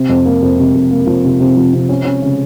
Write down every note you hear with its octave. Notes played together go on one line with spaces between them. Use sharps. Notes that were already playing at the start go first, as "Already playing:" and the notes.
Already playing: C3
F2
A#3
F2
C3
F2
A#3
F3
C3
C3
F3
C3
C#4
C#4
C#3